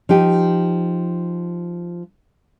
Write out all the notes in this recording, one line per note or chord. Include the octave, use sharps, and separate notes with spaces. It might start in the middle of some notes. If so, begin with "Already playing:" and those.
F3 D#4 G4